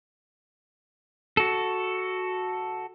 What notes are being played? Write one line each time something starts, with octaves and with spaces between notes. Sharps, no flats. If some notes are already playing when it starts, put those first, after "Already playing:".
F#4 A4